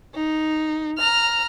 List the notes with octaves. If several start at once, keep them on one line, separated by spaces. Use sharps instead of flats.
D#4
A#5 F6